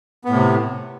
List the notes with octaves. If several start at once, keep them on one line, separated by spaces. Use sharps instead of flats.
A2 C3 B3